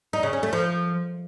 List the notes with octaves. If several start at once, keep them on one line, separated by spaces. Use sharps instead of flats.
D#4
C#3
C#4
A3
F3